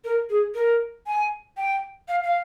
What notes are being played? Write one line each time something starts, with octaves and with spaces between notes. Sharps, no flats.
A#4
G#4
A#4
G#5
G5
F5
F5